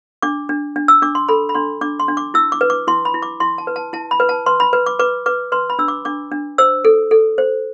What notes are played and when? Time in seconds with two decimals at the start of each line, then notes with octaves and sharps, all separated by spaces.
0.22 D4 D6
0.49 D4
0.76 D4
0.88 E6
1.02 D4 D6
1.15 C6
1.28 A4 B5
1.49 B5
1.55 D4 C6
1.81 D4 D6
2.00 C6
2.08 D4
2.17 D6
2.34 E4 E6
2.52 D6
2.61 B4
2.70 D6
2.87 E4 C6
3.05 B5
3.14 E4
3.22 D6
3.40 E4 C6
3.58 A5
3.67 B4
3.76 A5
3.93 E4 A5
4.11 B5
4.20 B4
4.29 A5
4.46 B4 C6
4.60 B5
4.73 B4
4.86 D6
4.99 B4 D6
5.26 B4 D6
5.52 B4 C6
5.70 B5
5.79 D4 E6
5.88 D6
6.05 D4 D6
6.32 D4
6.58 C5 E6
6.85 A4
7.11 A4
7.38 C5